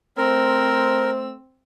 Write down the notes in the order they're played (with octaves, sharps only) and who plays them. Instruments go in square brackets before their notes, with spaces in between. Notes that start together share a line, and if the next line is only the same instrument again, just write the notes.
[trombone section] A3 C5 [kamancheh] C4 E6 [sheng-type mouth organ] A#4